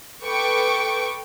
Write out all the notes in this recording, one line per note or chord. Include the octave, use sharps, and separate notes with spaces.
A4 B4 G5 C#6 D6